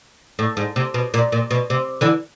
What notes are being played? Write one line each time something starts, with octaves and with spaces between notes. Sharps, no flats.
A2
G#2
C3
B2
A#2
A#2
B2
C3
D3 E3